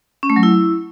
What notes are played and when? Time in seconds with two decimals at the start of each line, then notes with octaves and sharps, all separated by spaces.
0.23 C#4
0.30 A3
0.36 F#3
0.43 E4